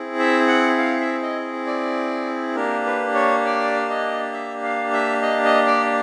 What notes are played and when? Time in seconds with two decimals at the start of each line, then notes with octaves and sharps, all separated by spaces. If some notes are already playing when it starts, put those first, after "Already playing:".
Already playing: C4 E4 G#4
0.19 E5
0.48 F#5
0.78 F5
1.00 E5
1.22 D#5
1.67 D5
2.56 A#3 D4 G4 A#4
2.86 B4
3.15 C#5
3.45 D5
3.90 D#5
4.33 E5
4.63 F5
4.93 E5
5.22 D#5
5.44 D#5
5.66 D5